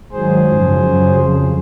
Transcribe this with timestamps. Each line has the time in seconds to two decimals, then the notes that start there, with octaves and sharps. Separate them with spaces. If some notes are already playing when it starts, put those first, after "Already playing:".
0.12 G#2 D#3 F#3 G#4 C5
0.45 F#2 C#3 F3
0.78 F#2 C#3 F#3
1.11 F2 C#3 F3